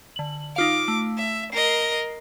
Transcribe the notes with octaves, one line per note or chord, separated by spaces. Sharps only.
D3 F#7
D#4 F4 F5 D6
A3
E5
A#4 D#5 C7